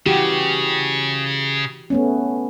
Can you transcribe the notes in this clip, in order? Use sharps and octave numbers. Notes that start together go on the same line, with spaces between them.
C#3 E3 F#4 G4
A3 B3 C#4